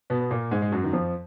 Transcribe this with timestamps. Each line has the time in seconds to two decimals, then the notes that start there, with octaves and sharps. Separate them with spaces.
0.10 B2 B3
0.21 B3
0.31 A#2 A#3
0.51 G#2 G#3
0.62 G#3
0.72 F#2 F#3
0.84 D#3
0.93 F2 F3